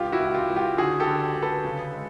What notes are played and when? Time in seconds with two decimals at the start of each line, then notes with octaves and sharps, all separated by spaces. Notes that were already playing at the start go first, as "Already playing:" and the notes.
Already playing: C#2 F4 G4
0.12 E4 F#4
0.20 C#2
0.34 F4 G4
0.50 C#2
0.56 F4 G4
0.77 D3 F#4 G#4
1.00 G4 A4
1.07 D3
1.35 D3
1.42 A4 B4
1.64 C#3
1.93 G#3